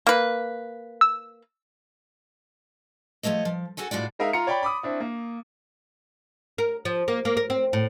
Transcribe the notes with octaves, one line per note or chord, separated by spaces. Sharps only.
A#3 B4
E6
F3 F#3 A3 C#5 D#5
F3
F#4 A4 F#5 G#5
A2 F4 F#4 D5
G#3 D#4 A#4 E5 F5
F4 A#5 C#7
C#5 D5 G5 B5
B5 D6 D#6
C4 D4 E4
A#3
A#4
F3
A#3
A#3
A#4
C4
A2